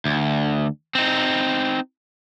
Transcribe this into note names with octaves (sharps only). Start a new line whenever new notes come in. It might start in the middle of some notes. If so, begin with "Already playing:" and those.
D2
C4 D#4